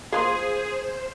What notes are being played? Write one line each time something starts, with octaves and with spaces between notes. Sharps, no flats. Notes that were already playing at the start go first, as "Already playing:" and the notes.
A#3 F4 G#4 C5